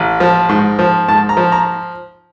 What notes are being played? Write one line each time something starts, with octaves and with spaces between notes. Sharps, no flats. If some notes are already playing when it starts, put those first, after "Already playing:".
Already playing: A1
F3
G#2
F3
G#2 A5
A#5
F3
A#5